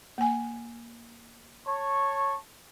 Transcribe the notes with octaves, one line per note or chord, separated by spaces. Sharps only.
A#3 G#5
C#5 A5 C#6